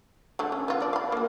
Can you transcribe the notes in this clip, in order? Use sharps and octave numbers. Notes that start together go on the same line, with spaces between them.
D3 A3
C#4
B3 F4
F3 D5
F5 B5
A#3 F#4